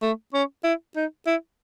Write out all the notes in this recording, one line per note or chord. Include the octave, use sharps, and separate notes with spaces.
A3
C#4
E4
D#4
E4